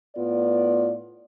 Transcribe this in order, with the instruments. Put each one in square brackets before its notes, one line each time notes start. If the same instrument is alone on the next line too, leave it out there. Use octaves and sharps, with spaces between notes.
[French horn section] A2 B3 F4 D5